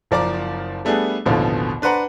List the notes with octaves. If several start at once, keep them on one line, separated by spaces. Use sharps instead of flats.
F#1 F3 D5 A#5 D6
G3 A3 B3 D4 G#4
A1 D#2 B2 D3 F3
D4 B4 C5 F#5 A#5